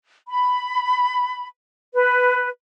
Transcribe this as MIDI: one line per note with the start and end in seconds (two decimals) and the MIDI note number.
0.28 1.46 83
1.93 2.48 71